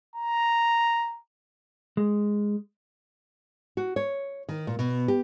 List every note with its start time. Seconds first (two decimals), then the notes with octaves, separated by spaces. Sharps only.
0.16 A#5
1.97 G#3
3.77 F#4
3.96 C#5
4.49 D#3
4.67 A#2
4.79 B2
5.08 G4